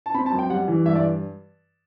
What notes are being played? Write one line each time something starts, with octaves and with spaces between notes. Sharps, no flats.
A5
C4 B5
A5
F#2
G5
G3 F#5
E3
G2 E5
D5